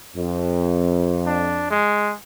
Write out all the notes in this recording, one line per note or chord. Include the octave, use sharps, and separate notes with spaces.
F2
D4
G#3